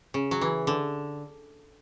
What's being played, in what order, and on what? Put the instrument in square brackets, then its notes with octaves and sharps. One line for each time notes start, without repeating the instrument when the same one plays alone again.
[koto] C#3
F#3
E3
D3